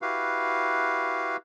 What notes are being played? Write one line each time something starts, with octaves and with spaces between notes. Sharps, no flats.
E4 F#4 G4 B4 F5